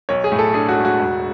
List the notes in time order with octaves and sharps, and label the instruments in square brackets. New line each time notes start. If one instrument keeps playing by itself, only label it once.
[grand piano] B1 C#5
G#4
A2
A4
D4 G#4
F#4
G#3
F#4
E1